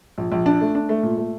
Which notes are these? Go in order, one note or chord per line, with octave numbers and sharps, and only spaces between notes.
A#1
A#1
D4
A3
D4
A3
A#2
A3